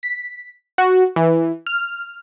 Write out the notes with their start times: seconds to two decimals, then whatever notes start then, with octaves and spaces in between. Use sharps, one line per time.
0.03 B6
0.78 F#4
1.16 E3
1.66 F6